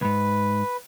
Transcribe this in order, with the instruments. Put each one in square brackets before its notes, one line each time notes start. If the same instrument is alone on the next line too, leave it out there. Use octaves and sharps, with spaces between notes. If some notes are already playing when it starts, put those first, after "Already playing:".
[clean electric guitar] C#2 G#2 [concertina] B4